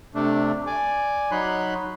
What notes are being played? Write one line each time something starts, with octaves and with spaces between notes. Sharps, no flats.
C3 A3 D4
D5 G#5 D6
F#3 D#4 C#5 B5 C6 F#6